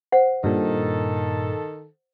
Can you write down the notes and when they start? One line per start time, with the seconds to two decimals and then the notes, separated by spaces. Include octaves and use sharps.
0.12 C5 F#5
0.44 G2 A#2 D#3 A4